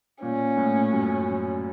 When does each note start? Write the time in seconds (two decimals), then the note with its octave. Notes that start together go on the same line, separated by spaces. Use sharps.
0.22 A#2 C#4
0.57 A2
0.93 F#2